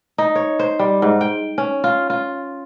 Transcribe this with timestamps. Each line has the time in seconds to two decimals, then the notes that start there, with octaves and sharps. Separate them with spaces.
0.18 D#4
0.36 C#5
0.59 C5
0.79 G3
1.02 G#2
1.21 G5
1.58 C#4
1.84 F4
2.10 F4